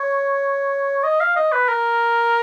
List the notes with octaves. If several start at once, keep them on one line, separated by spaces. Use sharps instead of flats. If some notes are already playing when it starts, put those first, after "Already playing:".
Already playing: C#5
D#5
F5
D#5
B4
A#4